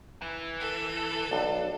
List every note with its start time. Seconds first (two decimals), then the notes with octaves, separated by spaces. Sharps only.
0.21 E3
0.60 A4
1.31 B1 D4